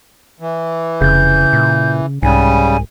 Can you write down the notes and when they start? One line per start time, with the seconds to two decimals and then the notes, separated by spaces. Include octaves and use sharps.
0.40 E3
1.01 F1 C#3 G6
1.53 A#2
2.23 C2 G#2 C#3 G3 G#5